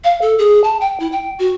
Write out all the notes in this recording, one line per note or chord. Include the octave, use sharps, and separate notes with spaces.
F5
A4
G#4
A5
G5
E4
G5
F#4